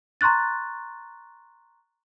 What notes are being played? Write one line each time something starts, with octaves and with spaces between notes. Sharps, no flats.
A#5 C6 C#6 F#6 A6